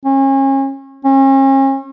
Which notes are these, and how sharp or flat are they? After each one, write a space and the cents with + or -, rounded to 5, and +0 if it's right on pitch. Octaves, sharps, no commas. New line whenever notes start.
C#4 -35
C#4 -40